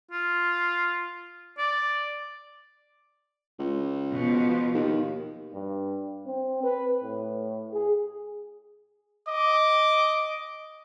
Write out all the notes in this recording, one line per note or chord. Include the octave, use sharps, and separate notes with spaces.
F4
D5
C#2
B2 F3
D#2
G2
C4
B4
A2
G#4
D#5 D6